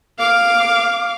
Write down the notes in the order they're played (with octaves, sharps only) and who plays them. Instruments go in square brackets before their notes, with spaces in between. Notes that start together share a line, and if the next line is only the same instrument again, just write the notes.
[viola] F5 D6